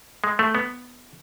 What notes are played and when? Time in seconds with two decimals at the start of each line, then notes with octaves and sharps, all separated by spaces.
0.24 G#3
0.39 A3
0.55 B3